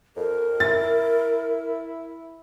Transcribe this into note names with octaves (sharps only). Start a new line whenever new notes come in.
F2 A#4
E4 A6